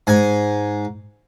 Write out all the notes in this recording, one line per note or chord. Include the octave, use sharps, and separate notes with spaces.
G#2 G#5